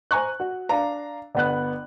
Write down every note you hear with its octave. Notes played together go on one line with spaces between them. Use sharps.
C5 G#5 A#5 C#6 F#6
F#4
D4 F5 A#5
G1 B3 F#6